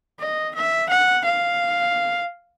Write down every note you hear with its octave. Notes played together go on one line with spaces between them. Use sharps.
D#5
E5
F#5
F5